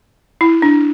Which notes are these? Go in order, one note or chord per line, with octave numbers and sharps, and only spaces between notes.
E4
D4